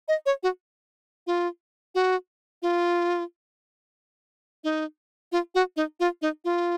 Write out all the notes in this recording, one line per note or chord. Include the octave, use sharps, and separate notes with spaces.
D#5
C#5
F#4
F4
F#4
F4
D#4
F4
F#4
D#4
F4
D#4
F4